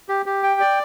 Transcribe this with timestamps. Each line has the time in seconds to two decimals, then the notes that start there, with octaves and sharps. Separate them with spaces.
0.09 G4
0.26 G4
0.43 G5
0.60 D5